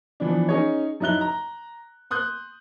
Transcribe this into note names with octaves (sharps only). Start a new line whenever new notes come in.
E3 F3 B3 D4
C#4 D#4 G#4 C#5
F#2 D#4 E4 F#6 G7
A#5
C6 D#6 F#6 G6